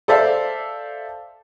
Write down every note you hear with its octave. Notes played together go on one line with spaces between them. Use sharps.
A4 C5 D5 E5 F5